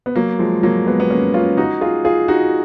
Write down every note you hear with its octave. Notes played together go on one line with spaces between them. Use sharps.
B3
F#3 A#3
F3 G#3
F#3 A#3
G#3 B3
B3
A#3 C#4
C#4 F4
D#4 F#4
F4 G#4
F4 G#4
D#4 F#4